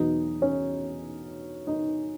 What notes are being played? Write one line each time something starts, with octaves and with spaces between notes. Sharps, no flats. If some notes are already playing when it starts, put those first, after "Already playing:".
Already playing: E2 B2 F#3 B3 D#4
C#4
D#4